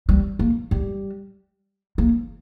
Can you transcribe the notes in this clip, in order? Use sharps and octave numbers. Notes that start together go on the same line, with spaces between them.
G3
A#3
G3
A#3